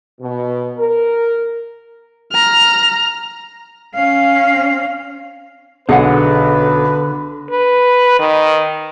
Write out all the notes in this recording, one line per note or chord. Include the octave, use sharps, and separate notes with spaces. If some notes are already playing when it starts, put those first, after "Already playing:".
B2
A#4
A#5 F6
C#4 F5
B1 D3 G#4 B4 F#5 G#5
B4
D#3